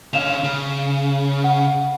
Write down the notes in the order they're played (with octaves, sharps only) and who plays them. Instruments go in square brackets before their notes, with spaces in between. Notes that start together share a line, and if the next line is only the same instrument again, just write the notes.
[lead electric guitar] D3 C#4 [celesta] F5 E7 F7
[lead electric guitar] C#3
[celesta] F#5